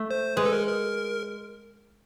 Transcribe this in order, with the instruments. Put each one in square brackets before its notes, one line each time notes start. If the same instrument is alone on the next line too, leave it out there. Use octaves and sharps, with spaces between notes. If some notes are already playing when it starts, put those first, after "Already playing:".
Already playing: [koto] A3
[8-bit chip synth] C5
[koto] G#3 [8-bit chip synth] B4
[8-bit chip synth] A4
A#4
A#4